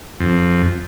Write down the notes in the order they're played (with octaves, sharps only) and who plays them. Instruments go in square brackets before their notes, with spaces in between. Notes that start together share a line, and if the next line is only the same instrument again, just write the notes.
[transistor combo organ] F2